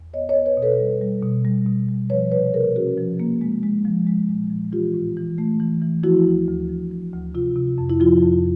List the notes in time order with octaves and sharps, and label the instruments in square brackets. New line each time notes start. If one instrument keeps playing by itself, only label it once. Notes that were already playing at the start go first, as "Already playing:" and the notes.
Already playing: [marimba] E2
B3 C#5 D#5
C#5 D#5
B3
B4 C#5
B2
A4 B4
G3
G3
B2
G3
B2
G3
F3 B4 C#5
C3 B4 C#5
A#3 G#4 A#4
C#4 F#4 G#4
F3
A#3
G#3
G#3
F3
G#3
A#2
F3
E3 F4 G4
A2
E3
A3
E3
E3
F3 E4 F#4
D2
D2
F3
F3
D2
C3 F4
C3
F2
E4
F3 F4
F2